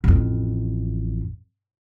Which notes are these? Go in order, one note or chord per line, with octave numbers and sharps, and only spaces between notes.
A1 F2